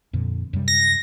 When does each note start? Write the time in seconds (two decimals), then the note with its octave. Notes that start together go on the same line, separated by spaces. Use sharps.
0.13 F2 A#2 D3
0.53 F#2 C3 G3
0.68 A#6